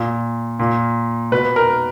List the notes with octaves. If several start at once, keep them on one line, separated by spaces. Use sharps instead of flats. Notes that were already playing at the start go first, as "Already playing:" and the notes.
Already playing: A#2
A#2
B2 B4
A#4